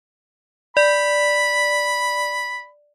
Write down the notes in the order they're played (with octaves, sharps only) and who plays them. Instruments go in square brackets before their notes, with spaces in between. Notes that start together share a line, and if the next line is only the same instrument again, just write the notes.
[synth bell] D5 [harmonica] B5